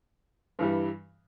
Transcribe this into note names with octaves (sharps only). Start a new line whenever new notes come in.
G2 E3 G3